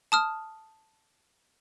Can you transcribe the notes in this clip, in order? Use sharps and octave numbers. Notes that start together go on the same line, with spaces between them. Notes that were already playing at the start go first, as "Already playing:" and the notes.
A5 D#6 F6